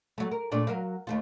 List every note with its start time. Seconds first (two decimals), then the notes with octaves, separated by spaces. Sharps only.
0.18 F#3 A3
0.31 A#4
0.51 A#2 A3 D4
0.67 F#3 A#4 F5
1.07 D#2 A3 F4